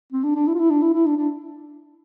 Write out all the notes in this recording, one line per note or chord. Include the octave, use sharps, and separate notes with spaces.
C4
D4
D4
E4
F4
E4
D4
E4
E4
D4
D4